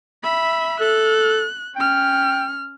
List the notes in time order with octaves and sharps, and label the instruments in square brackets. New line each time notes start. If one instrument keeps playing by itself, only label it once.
[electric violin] E5 B5
[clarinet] A4 [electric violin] F#6
[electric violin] C#4 F6 [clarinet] G5